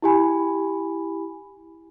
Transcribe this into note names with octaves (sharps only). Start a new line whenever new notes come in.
E4 G4 G#5 B5